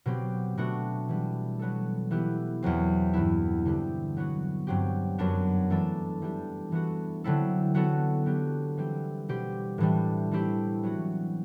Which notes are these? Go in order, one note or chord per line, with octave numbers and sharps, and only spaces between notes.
B2 F#3 C4 G4
B2 A3 D4 F#4
E3 G3 D4
F#3 B3 F#4 A4
E3 B3 E4 G4
E2 B2 F#3 C4
G2 E3 B3 E4
D3 G3 C4 E4 G4
F#3 B3 F#4
G2 F#3 C4 G4
F#2 F#3 B3 D4
E3 A3 D4 A4
E3 G3 D4 G4
E3 B3 F#4 A4
D3 F#3 C4 E4 A4
F#3 B3 F#4 A4
F#3 B3 D4 G4
E3 G3 C4 G4
B2 G3 C4 G4
A2 E3 G3 D4
E3 A3 C4 E4 G4
F#3 B3 F#4